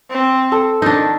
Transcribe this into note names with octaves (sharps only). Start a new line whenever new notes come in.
C4
A4
D#3 D4 D#4